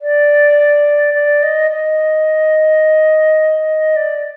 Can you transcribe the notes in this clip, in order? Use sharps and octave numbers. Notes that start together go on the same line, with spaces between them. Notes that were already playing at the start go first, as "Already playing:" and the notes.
D5
D5
D#5
D#5
D5